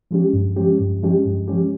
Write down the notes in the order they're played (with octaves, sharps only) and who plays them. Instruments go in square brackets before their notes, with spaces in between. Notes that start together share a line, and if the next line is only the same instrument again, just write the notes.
[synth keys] F3 G#3 C#4 G4
G2
F3 G#3 C#4 G4
G2
F3 G#3 C#4 G4
G2
F3 G#3 C#4 G4